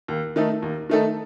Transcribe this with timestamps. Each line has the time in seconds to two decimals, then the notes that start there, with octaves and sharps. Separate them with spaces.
0.08 D#2
0.36 D#3 A3 D#4 A4
0.62 D#2
0.89 D#3 A3 D#4 A4